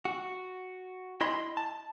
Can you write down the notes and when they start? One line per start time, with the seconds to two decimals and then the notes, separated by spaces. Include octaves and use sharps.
0.05 F#4
1.21 E4 D#5 B5 C6
1.57 A5